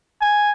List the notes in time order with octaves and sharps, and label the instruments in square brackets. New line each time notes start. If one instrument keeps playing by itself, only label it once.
[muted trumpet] G#5